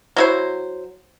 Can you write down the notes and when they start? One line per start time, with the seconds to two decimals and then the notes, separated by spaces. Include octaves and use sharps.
0.16 F#3 E4 C5